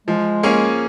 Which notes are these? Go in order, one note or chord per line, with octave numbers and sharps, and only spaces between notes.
F3 G#3
A#3 C#4 G#4